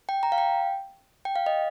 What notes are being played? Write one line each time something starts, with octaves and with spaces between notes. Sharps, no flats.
G5
A#5
F5
G5
G5
F5
D#5